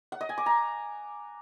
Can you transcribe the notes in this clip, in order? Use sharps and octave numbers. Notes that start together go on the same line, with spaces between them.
F#5
D#5
G#5
D6
A#5